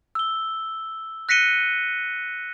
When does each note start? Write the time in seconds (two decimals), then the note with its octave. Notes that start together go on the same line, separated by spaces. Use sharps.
0.15 E6 G7
1.29 F#6 A#6 B6 C#7 D#7 G7